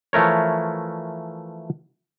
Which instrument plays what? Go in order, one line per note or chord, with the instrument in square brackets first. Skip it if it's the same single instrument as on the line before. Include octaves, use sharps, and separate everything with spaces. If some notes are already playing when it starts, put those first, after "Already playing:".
[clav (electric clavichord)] E3 F3 A3 A#4 C#5